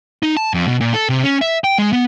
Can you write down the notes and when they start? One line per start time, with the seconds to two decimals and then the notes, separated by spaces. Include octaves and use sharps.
0.23 D#4
0.37 A5
0.54 F2
0.68 B2
0.81 A#2
0.94 A4
1.09 C3
1.23 C#4
1.41 E5
1.64 G5
1.78 G#3
1.93 B3